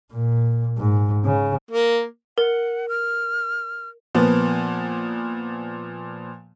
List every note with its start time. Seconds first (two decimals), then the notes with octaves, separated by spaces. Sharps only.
0.13 A#2
0.78 G#2
1.25 C#3
1.71 A#3
2.38 A#4 F#5
2.89 F6
4.15 A#2 F3 B3